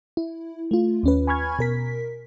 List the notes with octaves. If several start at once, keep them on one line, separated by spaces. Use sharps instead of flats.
E4
A3 F4
D#2 C#4 B4
G#5 B5 C#6 F6 G#6
B2 A#4 B6